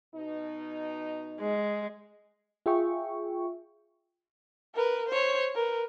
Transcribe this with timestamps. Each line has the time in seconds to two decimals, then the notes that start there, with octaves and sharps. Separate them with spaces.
0.15 B2 D#4
1.40 G#3
2.66 F4 G#4 E5 G5 C#6
4.75 A#4 B4
5.08 C5 C#5
5.55 A#4 B4